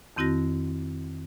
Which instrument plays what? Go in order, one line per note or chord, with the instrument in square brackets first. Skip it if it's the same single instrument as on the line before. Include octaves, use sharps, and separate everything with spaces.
[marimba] F2 D#3 C4 E4 F#4 A#6